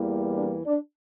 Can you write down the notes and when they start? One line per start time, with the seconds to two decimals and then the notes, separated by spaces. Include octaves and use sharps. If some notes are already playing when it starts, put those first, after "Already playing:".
Already playing: E2 E3 G3 A#3
0.35 D4
0.66 D4